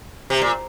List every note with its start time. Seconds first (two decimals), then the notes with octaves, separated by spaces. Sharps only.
0.30 C3
0.41 A#2